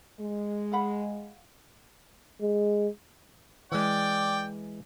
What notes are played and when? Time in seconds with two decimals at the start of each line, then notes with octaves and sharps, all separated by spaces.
0.19 G#3
0.72 F5 F#5 B5
2.41 G#3
3.72 E3 G#3 D5 G5